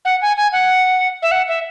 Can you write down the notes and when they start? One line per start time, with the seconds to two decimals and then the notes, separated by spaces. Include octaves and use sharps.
0.05 F#5
0.22 G#5
0.37 G#5
0.52 F#5
1.22 E5
1.32 F#5
1.48 E5